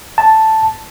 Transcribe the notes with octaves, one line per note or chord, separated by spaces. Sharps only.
A5